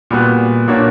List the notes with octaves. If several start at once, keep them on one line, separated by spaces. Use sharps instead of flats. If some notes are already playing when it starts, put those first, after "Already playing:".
A#2 G3 B3 F#4
A#2 A#3 D4 F#4 C#5